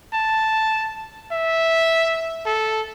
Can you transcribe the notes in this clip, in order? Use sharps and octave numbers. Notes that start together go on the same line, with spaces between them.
A5
E5
A4